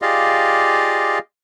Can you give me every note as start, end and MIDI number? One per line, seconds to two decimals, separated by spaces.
0.02 1.19 65
0.02 1.19 67
0.02 1.19 68
0.02 1.19 74
0.02 1.19 75
0.02 1.19 77